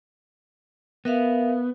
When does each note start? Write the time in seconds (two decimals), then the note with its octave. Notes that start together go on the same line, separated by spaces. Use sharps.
1.05 B3 A#4 E5 F5